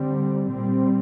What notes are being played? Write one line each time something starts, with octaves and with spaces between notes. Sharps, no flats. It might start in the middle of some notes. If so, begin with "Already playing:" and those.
Already playing: D3 G3 C4
A#2 G3 C4